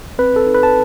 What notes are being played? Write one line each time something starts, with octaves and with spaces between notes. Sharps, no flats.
C4 B4
A4
D#4
B4
A5